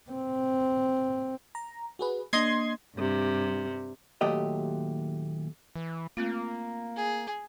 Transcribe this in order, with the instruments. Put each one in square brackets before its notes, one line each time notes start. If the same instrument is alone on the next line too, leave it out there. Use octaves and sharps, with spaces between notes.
[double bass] C4
[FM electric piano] A#5
F#4 G#4 B4
[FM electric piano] A#3 D4 [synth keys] D#5 C6 G#6
[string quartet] G2 C3
[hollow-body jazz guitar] D#2 A#2 F#3 A3 G4 D#5
[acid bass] E3
[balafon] A3 C4 F4 [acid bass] A#3
[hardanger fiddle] G#4